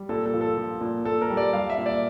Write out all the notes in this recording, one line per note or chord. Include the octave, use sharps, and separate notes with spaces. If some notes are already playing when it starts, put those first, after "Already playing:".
Already playing: G3
A#2 A4
A4
F3
A4
F3
A#2
A#2 A4
A#4
G3
D5
G3 F5
E5
A#2
D5